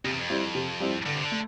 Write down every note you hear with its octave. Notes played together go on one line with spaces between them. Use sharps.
F2 C3
E2
F2
G3 C4 E4
C3
G3 C4 E4
G2 D3
C3
D3
A3